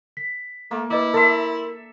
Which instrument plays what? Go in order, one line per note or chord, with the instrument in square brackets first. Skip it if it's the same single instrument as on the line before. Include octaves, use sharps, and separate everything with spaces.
[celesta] B6
[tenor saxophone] A3 [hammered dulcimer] A#3
[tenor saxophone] E4 [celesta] B4 D#5 D6
[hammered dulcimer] A4 E5 [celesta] A#4 C6